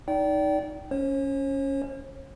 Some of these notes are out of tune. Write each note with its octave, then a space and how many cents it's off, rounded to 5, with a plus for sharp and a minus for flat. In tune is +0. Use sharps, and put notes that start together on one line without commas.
D#4 +0 D5 -25 G5 -25
C#4 +0 C#5 -45